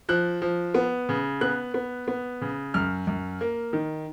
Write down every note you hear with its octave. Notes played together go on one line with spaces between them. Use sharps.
F3 F#6
F3
B3
C#3
B3 F#6
B3
B3
C#3
F#2 F6
F#2
A#3
D#3